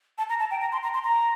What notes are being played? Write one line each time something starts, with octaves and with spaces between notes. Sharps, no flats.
A5
A#5
A5
G5
A#5
C6
A#5
C6
A#5